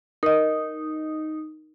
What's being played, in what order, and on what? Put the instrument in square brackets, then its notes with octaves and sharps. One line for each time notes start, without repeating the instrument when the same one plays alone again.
[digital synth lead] D#4 [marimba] A#4 D#5